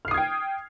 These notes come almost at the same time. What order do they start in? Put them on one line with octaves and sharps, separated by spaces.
F6 C7 D#6 G#6 G5